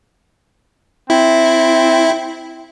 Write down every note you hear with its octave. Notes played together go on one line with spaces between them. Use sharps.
C4 E4